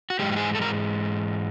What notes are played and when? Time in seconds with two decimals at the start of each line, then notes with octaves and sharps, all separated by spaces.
0.10 F#4
0.19 G#2 E3 G#3 G4
0.32 G4
0.37 G#4
0.55 A4
0.62 A#4